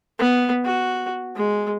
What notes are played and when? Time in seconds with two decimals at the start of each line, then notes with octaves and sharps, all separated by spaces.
0.19 B3
0.65 F#4
1.36 G#3